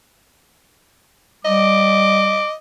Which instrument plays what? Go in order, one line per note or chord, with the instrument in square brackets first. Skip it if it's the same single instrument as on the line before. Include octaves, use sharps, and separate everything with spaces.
[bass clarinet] G3 [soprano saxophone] D#5 [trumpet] D6